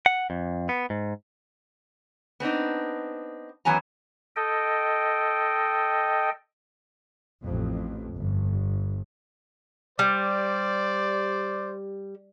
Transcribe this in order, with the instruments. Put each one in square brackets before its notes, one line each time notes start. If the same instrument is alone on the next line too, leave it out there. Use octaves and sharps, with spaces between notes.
[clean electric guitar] F#5
F2
B3
G#2
[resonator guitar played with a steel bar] B3 C4 D4 D#4
F#2 E3 F#3 B3 G#5 A#5
[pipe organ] A4 D#5 G5
[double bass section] A1 F2
G1
[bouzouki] G3 [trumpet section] C5 D5